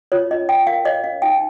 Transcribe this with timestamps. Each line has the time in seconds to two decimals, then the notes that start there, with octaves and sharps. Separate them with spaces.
0.12 F4 C#5
0.31 C#4 D#5
0.49 C#4 G5
0.67 A#4 F5
0.85 C#5 D#5
1.04 C#4 F5
1.22 D#4 G5